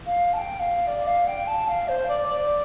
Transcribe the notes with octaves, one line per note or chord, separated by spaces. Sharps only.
F5
A5
G5
F5
D5
F5
G5
A5
F5
C5
D5
D5